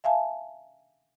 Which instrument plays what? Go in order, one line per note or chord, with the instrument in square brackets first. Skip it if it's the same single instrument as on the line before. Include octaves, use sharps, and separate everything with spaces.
[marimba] E5 F5 G#5 A5